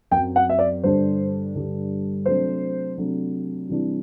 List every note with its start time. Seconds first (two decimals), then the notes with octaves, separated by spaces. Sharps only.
0.11 F#2 F#3 C4 G5
0.36 F#5
0.49 E5
0.59 D5
0.84 G2 D3 G3 D4 C5
1.55 G2 D3 G3 D4
2.26 C3 F#3 A3 D4 C5
2.98 C3 F#3 A3 D4
3.69 C3 E3 G3 D4